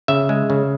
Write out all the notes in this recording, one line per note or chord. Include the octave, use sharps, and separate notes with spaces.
C#3 E5
G#3
C#3